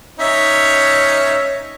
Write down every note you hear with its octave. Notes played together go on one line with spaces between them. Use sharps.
C#4 D#4 C#5 E5